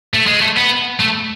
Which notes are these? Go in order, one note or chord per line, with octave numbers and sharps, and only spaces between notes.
A3
G#3
A3
B3
A3